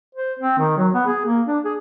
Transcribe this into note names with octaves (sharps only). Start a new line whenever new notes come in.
C5
C4
D#3
F#3
B3
G#4
A#3
D4
G#4